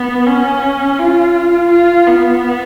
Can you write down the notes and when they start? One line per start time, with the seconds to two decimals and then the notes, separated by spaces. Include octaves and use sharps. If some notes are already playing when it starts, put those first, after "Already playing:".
Already playing: B3
0.26 C#4
0.99 F4
1.70 F4
2.07 B3